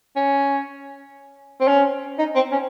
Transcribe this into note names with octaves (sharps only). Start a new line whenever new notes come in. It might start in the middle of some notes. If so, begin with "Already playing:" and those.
C#4
C4
C#4
D#4
C4
C#4